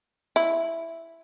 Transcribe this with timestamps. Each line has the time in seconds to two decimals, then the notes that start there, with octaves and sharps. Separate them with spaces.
0.36 E4